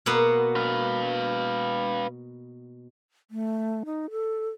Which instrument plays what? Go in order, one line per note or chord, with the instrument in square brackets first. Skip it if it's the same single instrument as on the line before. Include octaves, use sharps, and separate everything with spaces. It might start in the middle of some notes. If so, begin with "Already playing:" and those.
[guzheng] B2 A#3 B3
[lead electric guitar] B4 F5
[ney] A3
D#4
A4